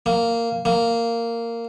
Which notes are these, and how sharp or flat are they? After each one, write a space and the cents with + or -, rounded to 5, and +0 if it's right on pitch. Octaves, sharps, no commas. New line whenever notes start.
A#3 -10
A#3 -10